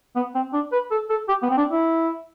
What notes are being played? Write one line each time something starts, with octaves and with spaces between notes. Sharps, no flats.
B3
C4
D4
B4
A4
A4
G4
B3
C4
D4
E4